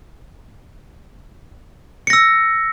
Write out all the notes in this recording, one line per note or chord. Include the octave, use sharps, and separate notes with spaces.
E6 A#6 C#7